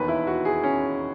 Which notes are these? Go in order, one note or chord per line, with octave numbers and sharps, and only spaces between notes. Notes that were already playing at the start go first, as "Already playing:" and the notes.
Already playing: E1 D#2 D#3 B4
E4
F#4
G#4
C#4